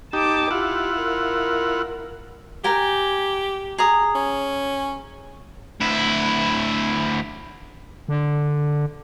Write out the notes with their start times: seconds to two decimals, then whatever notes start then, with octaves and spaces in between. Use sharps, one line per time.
0.13 D#4 G4 A5 D6
0.51 E4 F4 G4 F#5
1.00 A#4
2.64 G4 A#4 G5 G#5
3.78 G#4 A#5 D#6
4.15 C#4
5.81 D2 E4
8.08 D3